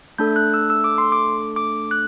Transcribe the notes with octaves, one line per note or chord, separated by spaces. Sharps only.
A3 D4 A4 G6
F#6
E6
E6
D6
C6
D6
D6
F#6